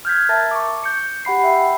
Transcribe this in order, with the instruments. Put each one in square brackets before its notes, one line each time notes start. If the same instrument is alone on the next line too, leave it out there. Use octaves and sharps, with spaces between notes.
[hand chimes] F6 G6 G#6 B6
A#4 E5 A5 A6
C#6 D6
G6 C#7
G4 F#5 B5 C7
E5 G5 B5